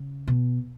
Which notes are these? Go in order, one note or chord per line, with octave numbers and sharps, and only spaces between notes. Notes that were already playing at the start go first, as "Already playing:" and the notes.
Already playing: C#3
B2